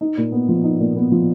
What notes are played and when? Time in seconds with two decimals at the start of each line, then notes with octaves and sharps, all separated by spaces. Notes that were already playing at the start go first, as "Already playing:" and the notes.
0.01 D#4
0.17 A#2
0.32 B3
0.48 F3
0.64 D#4
0.80 A#2
0.96 B3
1.12 F3